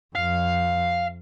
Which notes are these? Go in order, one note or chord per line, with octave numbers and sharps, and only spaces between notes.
F2 F5